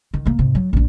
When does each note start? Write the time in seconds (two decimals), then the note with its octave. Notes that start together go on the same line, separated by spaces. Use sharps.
0.14 D#3
0.26 C3 A#3
0.39 G#2 C3
0.55 F#3
0.73 A#1 D4